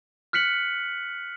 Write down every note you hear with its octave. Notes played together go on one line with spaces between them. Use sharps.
F6 F#6 B6 C#7 F#7